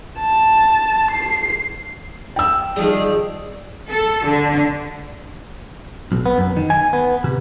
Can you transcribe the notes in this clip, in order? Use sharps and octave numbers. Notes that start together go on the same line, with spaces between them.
A5
C7
G5 E6
D#3 F3 G3 G#4
A4
D3
B1
B3
F#2
D#3
G#5
B3
C3